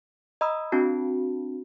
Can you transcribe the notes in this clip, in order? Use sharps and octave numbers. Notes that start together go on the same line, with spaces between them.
D#5 A#5 B5 D#6 E6
C4 D4 F#4 A5